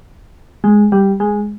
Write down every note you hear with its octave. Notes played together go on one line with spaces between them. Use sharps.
G#3
G3
G#3